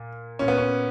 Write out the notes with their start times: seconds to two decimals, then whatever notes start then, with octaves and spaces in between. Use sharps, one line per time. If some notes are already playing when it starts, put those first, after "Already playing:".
Already playing: A#2
0.39 A#2 C#4
0.48 B3
0.58 C#4